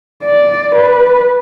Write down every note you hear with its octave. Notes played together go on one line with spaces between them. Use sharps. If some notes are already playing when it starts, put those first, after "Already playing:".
D5
B4